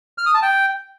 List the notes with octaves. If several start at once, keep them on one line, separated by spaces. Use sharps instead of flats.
F6
D#6
A5
G5